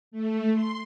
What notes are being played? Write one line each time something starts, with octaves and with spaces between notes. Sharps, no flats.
A3
C6